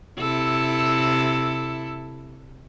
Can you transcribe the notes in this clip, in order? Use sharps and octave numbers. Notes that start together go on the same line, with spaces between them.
C3 E4 A4